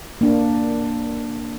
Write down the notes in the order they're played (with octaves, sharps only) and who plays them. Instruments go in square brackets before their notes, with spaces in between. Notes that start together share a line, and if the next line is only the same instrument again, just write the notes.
[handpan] A#3 D4